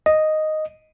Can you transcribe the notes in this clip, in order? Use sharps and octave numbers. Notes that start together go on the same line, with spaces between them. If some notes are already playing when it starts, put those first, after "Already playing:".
D#5